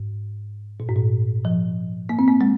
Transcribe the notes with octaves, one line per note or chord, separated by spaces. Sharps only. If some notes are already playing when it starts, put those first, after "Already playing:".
Already playing: G#2
A#2
G#2
A#2
F3
A#3
C4
A#3
G#3